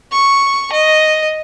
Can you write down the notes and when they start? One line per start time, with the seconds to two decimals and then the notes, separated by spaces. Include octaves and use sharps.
0.12 C#6
0.73 D#5